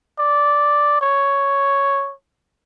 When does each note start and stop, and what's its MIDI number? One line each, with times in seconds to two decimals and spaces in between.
0.19 0.98 74
1.02 2.13 73